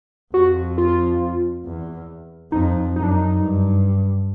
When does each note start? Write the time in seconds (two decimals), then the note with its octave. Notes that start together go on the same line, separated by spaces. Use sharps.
0.34 F2 F#4
0.78 F4
1.65 E2
2.52 F2 D#4
2.96 F#2 D#4
3.03 D4
3.11 D#4
3.40 G2